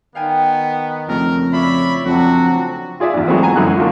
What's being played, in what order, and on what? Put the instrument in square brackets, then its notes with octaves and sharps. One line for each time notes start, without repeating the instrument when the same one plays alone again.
[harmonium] D#3 [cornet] B3 [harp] F5 G5 G#5
[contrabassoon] F2 [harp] C#3 A3 [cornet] A#4
[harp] E4 F4 [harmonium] C#5 D5 E5 [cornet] B5
[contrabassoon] F2 [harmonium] F#3 C4 D4 [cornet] F#4
[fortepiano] F4 G#4 D5 E5
E2 G#2
E3 F#3 G#3 A3 B3 C4
F#5 G#5 A#5
F#2 D3 E3 G#3 F#6
F#3 A#3 D4 D#4 F4 F#4